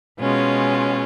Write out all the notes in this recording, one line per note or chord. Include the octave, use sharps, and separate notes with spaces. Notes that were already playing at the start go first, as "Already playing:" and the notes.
B2 G#3 C#4 F4